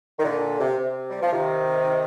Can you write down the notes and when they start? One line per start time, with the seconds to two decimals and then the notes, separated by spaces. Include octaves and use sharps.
0.19 D#3
0.24 A#2 D3
0.60 C3
0.78 C3
1.10 G3
1.22 F3
1.32 C3 D#3